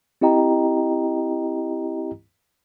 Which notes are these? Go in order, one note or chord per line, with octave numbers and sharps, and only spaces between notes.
C4 E4 G4 D#5 G5 A#5